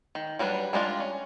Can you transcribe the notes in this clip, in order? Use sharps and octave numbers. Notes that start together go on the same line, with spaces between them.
D#3
F#3 G3 D4 B4
G3 G#3 D4 F4
C#4